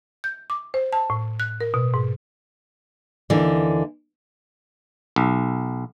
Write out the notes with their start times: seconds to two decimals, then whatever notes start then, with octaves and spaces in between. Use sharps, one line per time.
0.24 G6
0.50 D6
0.74 C5
0.93 A5
1.10 A2
1.40 F#6
1.61 A#4
1.74 B2
1.94 G#2
3.30 D#2 D3 E3
5.16 B1